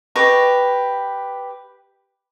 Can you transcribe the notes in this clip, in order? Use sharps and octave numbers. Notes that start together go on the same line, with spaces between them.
G4 B4 D#5 C#6